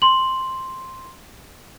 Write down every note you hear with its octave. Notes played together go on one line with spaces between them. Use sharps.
C6 F#7